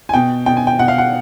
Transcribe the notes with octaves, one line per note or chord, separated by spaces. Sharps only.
G#5
B2 G5
B2 G5
G#5
G5
B2 F#5
F5
F#5